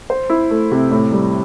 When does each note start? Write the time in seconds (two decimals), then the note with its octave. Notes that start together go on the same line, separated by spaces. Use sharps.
0.10 C5
0.30 E4
0.51 A3
0.72 C3
0.91 A2
1.12 G3